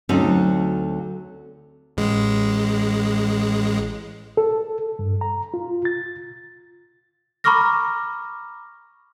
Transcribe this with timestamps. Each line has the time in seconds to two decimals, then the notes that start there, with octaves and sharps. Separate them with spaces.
0.09 D2 F#3 C4 C#4 D#4 A4
1.97 A1 G#3
4.37 A4
4.99 G2
5.21 A#5
5.54 F4
5.85 A6
7.44 A#5 B5 C#6 D6 F6 A#6